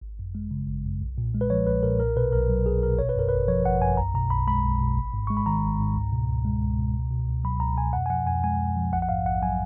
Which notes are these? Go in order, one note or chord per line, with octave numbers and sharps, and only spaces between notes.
G#1
F#2
G#3
C#3
G#1
F#2
B1
A#2
G#3
B4
F3 C#5
B1 B4
A#2 A#4
B1 A#4
B2 B4
B1 A#4
F#3
B1 G#4
B2 A#4
G#1 C#5
B4
F#2 A#4
G#1 B4
F3 C#5
G#1 F#5
F#2 G#5
B1 A#5
B2 A#5
B1 B5
G#3 B5
B1
B2
G#1
G#2
G#3 C#6
B5
D#3 A#5
G#1
G#2
C#2
B2
C#2
G#3
C#2
B2
C#2
B2
C#2
F#3 B5
C#2 A#5
B2 G#5
F2 F#5
G#5
F3 F#5
F2 G#5
G#3 G#5
F2
F3
A#1 F#5
F#5
G#2 F5
A#1 F#5
F#3 G#5